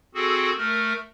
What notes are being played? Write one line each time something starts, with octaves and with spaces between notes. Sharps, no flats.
C4 F#4 G#4 A4
A3 A#4